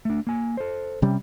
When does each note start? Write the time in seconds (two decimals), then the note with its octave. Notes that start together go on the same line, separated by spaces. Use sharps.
0.05 A3 D4
0.27 A#3 G#5
0.57 A4 C5
1.02 C3 G3 C#4